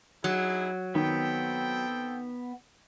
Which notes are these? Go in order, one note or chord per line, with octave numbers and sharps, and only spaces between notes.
F#3 D#4 E4 G#4
D#3 B3 C4 A4 G5